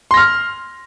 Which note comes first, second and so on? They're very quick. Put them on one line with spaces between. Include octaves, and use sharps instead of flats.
C6 A#6 F6